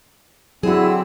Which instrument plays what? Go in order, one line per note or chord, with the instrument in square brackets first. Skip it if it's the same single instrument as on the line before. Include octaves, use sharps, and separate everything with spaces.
[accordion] D3 C4 E6 [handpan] F#3 F#4 [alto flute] E4 [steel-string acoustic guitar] G#4 F#5